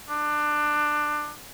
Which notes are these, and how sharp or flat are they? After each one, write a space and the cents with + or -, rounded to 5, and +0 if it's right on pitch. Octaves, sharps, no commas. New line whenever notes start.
D4 +20